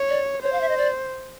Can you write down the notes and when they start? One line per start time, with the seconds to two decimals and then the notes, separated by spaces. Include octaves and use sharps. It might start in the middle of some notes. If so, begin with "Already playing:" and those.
Already playing: C#5
0.09 D5
0.42 C5 C#5
0.53 F5
0.61 E5
0.69 D#5
0.77 D5